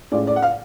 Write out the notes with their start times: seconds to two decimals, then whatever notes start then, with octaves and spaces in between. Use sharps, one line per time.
0.12 A2 G#3 C#4 F4 D5
0.27 D5
0.36 F#5
0.42 F5